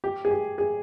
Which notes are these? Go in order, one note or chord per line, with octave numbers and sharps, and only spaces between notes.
G4
G#4
G4
G#4